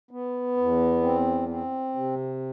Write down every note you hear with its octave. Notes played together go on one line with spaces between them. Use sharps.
B3
E2
C4
C4
C3